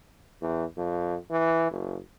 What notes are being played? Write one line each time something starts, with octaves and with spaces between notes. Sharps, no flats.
E2
F2
E3
F#1